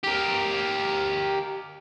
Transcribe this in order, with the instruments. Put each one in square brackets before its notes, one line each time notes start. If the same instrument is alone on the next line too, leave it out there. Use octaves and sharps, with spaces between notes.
[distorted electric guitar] G4 A#4